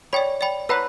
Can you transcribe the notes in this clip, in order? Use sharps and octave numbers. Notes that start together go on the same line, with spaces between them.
C#5 D5 G5 B5
D5 G5 B5
B4 C#5 F#5 A#5 E6